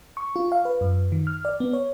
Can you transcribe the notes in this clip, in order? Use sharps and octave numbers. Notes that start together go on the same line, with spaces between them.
C#6
F4
F5
B4
F#2
D#3
F6
D5
B3
C#5